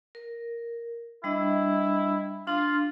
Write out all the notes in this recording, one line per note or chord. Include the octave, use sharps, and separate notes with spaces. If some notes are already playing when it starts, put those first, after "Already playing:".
A#4
G3 D4 E4 D#5
D4 F4